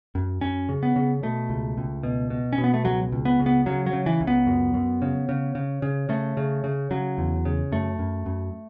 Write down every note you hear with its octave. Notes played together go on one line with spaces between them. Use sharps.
F#2
F#2 C#4
C#3
B3
C#3
B2 A3
C#2
C#2
B2
B2
C#4
B2
B3
A3
C#2 F#3
C#2
B3
C#3
B3
C#3 F#3
F#3
C#3
E3
C#2
B3
F#2
F#2
C#3
C#3
C#3
C#3
C#3 A3
C#3
C#3
C#3 F#3
E2
C#3
F#2 A3
F#2
F#2